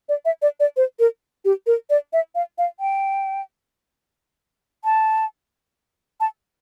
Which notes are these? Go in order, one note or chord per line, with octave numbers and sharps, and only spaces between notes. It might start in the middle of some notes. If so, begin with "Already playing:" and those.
D5
E5
D5
D5
C5
A#4
G4
A#4
D5
E5
F5
F5
G5
A5
A5